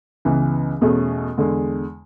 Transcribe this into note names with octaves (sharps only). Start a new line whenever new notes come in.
C#2 C#3 E3 B3
E2 B2 A3 C#4 G#4
E2 D3 G#3